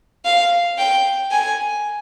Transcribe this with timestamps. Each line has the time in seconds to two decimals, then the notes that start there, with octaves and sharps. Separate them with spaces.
0.25 F5
0.78 G5
1.31 G#5